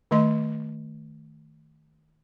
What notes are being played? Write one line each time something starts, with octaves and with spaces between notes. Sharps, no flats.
D#3 A3 D#5 C6